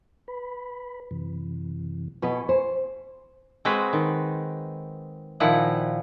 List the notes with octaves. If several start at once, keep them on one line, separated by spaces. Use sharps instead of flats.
B4 B5
F#2 C3 E3
B2 B4 D#5 G#5 C#6
C5
G#3 C4 F#4 G#4 B4
D#3
A#2 D#3 F3 E4 F#5